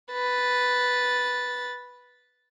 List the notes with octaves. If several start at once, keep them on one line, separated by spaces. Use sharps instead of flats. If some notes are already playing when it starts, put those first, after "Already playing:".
B4 A6